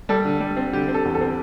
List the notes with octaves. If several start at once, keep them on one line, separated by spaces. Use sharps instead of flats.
G3 A4
D3
G3
C4
D3 G4
C4
A4
E2
A4
C4